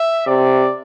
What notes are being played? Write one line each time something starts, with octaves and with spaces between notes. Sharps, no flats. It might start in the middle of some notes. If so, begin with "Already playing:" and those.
Already playing: E5
C3 D5